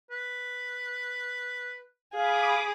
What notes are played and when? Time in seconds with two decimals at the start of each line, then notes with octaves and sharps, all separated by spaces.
0.11 B4
2.14 G#4 F5 B5 D6 D#6